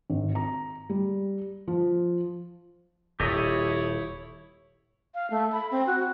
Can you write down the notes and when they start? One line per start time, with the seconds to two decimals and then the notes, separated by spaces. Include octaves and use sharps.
0.10 G#1
0.35 A#5
0.90 G3
1.68 F3
3.20 D#1 E4 G4 A4 C#5 D#5
5.14 F5
5.31 A3
5.52 B5
5.71 C4
5.87 F#4